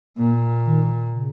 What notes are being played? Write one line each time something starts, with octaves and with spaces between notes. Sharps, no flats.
A#2 A#3
D#3
C#3